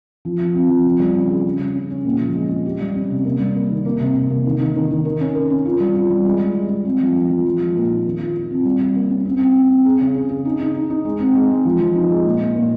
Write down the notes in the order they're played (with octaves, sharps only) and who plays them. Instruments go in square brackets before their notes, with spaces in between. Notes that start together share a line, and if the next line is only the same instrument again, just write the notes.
[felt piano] F3
F3
C4
F3
C#3
G3
C#4
G#4
C#3
C#3
C#4
C#4
A#2
F3
G#3
G#3
G4
G3
C#4
C3
A#3
G3
A#3
D#3
A#3
C3
C3
A#3
D#3
D#3
D#3
D#3
A#4
C#4
A#4
C#4
F4
G3
F4
G3
G#3
G#3
G#3
G#3
C4
F3
F3
F3
F3
G#3
A#2
D#4
D#3
F4
F4
C4
G3
G3
A#3
C#4
C4
C4
C4
C4
G#4
C#3
G#4
G#4
D#4
D#4
D#4
D#4
G#3
C4
G#3
G#3
F3
F3
D#4
G#3
A#2
A#2
A#2